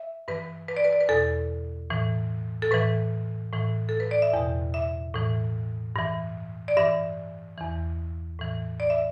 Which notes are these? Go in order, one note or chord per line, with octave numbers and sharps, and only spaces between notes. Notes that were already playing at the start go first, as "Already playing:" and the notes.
Already playing: E5
G2 E3 B4
B4
D5
B4
D5
B4
E2 B2 A4
A2 E3
A4
A2 E3 B4
A2 E3
A4
B4
D5
E5
E2 B2 G5
E5
A2 E3
G2 E3
D5
G2 E3 E5
E2 E3
A2 E3
D5
E5